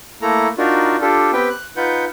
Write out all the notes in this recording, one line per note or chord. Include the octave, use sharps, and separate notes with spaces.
A3 A#3 E4 A4 A#5
D4 D#4 F4 F#4 A#4
D4 F4 G4 A4
B3 C4 G4 B4 G5
F#6
D#4 F4 B4 F#5 G6